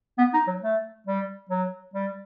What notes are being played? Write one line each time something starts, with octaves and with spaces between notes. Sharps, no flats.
B3
D#4
F#3
A3
G3
F#3
G3